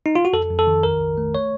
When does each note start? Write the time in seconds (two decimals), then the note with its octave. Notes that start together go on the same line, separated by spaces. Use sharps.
0.06 D#4
0.15 F4
0.25 F#4
0.33 F2 A4
0.50 F2
0.59 A4
0.67 D#3
0.83 A#1 A#4
1.01 A#1
1.17 A3
1.35 C#5